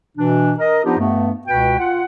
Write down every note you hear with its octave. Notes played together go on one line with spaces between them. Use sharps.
B2 E3 D4
A#4 D#5
F3 B3 D4 D#4 F4 G4
G2 A3 B3
C#2 B2 F#4 B4 G5
F4 F#5